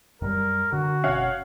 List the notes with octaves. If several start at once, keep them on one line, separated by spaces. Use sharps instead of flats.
F#2 G3 A#4
D3 F#4
F#1 B2 C#4 C#5 F5 F#5